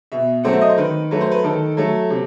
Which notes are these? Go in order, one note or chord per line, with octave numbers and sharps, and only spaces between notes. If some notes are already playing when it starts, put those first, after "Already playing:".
B2 E5
F#3 A3 C4 F#5
E5
D#5
C5
D#3 B4
F#3 A3 B4
C5
B4
D#3 A4
F#3 A3
C3